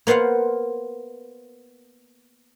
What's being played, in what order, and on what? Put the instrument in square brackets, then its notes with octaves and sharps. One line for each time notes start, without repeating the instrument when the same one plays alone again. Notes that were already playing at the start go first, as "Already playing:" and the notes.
[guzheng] A#3 B3 C5 F5 F#5